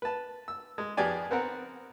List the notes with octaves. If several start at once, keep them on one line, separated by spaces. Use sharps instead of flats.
B4 A5
E6
G#3
F2 B3 G4 G#4 D5 G#5
B3 C4 A#4 F#5